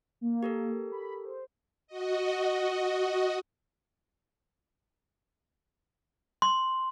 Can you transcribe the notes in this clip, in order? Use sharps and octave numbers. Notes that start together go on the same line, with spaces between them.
A#3
G4 A4 A#4
B5
C5
F#4 D#5
C6